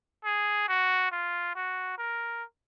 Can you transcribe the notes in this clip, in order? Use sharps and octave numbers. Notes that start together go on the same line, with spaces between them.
G#4
F#4
F4
F#4
A#4